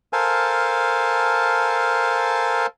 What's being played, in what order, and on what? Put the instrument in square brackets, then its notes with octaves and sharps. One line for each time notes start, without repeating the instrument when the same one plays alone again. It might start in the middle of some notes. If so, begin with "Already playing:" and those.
[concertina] A4 A#4 C5 F5 G#5 A5